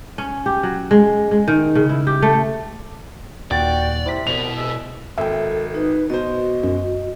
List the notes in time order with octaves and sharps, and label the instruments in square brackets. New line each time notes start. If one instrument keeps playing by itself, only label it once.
[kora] C#4
G4
F#3
G#3
G#3
D#3
C#3
E4
G4
A3
[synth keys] D#2 A#2 [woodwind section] F#4 F#5 G5 [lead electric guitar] D5 [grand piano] A6
[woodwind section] C3 [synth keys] E4 B6
[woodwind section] C2 [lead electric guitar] B2 [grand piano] F7
[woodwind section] C2 G#3 E6
[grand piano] G#1 [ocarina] A4 [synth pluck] E5 G5
[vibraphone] D#4 [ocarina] B4
[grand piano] B2 C5 [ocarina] F#4 [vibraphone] D#5
[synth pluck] F#2